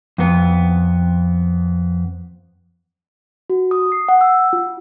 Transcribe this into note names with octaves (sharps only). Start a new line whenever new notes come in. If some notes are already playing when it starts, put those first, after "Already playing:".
F2 B3
F#4
D#6
C7
F#5
E6
F4